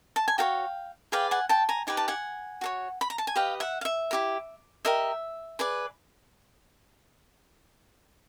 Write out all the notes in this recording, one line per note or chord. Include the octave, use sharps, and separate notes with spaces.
A5
G#5
F#4 A4 C#5 F5 G5
G#4 B4 D5 F5 G5
F#5 G#5
G5 A5
G#5 A#5
D#4 G4 B4 G#5
A5
F#5 G#5
F#4 A4 C#5
B5
A#5
A5
G#5
G4 B4 D#5 F5 G5
E5 F#5
F5
E5
E4 G4 A#4
G4 A#4 D#5 E5
G#4 B4 D5